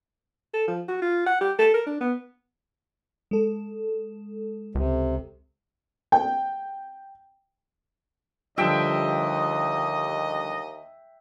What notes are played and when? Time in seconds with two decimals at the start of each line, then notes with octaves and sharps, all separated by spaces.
0.54 A4
0.68 F3
0.88 F#4
1.02 F4
1.27 F#5
1.41 G4
1.59 A4
1.74 A#4
1.87 D4
2.01 B3
3.31 G#3 A4
4.75 C#2 C3
6.12 G5
8.58 D#2 D3 F3 G3 D#5 E5 G5